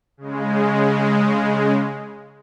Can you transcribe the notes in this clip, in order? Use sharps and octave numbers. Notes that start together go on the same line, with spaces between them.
C#3 G#3